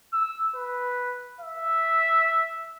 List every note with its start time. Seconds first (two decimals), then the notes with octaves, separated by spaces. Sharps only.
0.13 E6
0.55 B4
1.41 E5